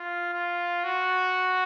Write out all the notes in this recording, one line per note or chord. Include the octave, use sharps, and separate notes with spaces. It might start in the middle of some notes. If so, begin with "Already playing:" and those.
Already playing: F4
F4
F#4